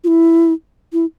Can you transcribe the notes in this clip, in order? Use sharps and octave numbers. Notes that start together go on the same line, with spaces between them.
F4
E4
E4